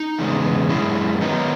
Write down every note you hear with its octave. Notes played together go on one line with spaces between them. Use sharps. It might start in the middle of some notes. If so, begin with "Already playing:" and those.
Already playing: D#4
E2 C#3 G#3 B3
F#2 C#3 G#3 E4 G#4
D#3 F#3 B3 D#4